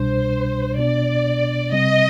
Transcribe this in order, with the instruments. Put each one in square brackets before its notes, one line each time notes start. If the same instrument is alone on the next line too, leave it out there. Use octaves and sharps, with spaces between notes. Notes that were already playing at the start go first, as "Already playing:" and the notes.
Already playing: [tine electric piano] C2 B2 G3 D4 [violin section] C5
[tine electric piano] B2 B3 D4 [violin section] D5
[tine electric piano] C3 G3 C4 [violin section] D#5